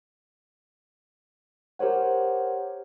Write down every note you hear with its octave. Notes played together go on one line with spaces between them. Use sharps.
G4 A#4 C5 C#5 F#5